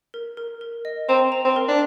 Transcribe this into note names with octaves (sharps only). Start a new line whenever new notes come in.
A#4
A#4
A#4
D#5
C4 A#5
A#5
C4
A#4
D4